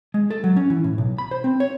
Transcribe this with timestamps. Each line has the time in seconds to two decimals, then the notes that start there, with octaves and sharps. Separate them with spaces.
0.14 G#3
0.30 A4
0.44 F#3
0.56 C#4
0.70 E3
0.84 A2
0.98 B1
1.18 B5
1.31 C5
1.44 C4
1.60 C#5